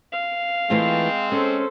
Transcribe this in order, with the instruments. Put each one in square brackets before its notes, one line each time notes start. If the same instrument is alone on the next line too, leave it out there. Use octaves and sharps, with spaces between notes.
[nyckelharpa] F5
[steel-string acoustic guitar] E3 A3 F4 [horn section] G#3 C4
[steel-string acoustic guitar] C#4 [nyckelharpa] A4 C5